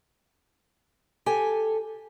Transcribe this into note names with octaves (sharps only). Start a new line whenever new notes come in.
G4 A4 G#5